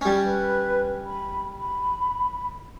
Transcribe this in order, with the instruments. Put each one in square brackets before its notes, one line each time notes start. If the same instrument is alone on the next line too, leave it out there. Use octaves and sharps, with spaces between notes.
[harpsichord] G3 C#4
[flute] B4
B5
B5